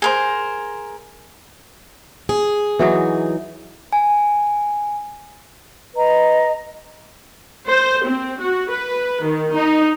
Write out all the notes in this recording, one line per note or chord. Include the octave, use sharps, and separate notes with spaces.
G#4 A#4 C5
G#4
E3 F#3 D#4
G#5
B4 D#5 A#5
C5
C4
F#4
B4
D#3
D#4